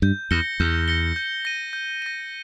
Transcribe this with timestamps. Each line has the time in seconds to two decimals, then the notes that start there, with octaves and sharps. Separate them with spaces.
0.02 G2 G6
0.31 E2 A#6 C#7 G7
0.60 E2 G6
0.88 A#6 C#7 G7
1.16 G6
1.45 A#6 D#7
1.73 G6
2.02 A#6 D#7